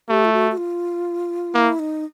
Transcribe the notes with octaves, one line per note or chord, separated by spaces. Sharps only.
A3 G4
F4
F#4
F#4
F4
A#3 E4
D#4